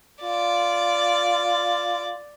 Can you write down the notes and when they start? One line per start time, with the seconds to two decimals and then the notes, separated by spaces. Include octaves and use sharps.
0.23 F4 D5